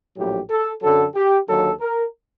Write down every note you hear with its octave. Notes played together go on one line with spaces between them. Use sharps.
A#1 A2 F#3 G4
A4
F#2 D3 F#3 A4
G4
D#2 D3 F#3 A4
A#4